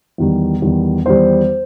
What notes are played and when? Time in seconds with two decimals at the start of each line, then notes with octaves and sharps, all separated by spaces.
0.18 E2 D#3 G3
0.62 E2 D#3 G3
1.06 E2 D#3 G3 C5